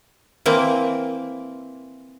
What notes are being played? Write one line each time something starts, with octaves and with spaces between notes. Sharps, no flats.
E3 A#3 C4